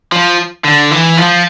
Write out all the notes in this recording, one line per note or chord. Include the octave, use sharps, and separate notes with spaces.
F3
D3
E3
F3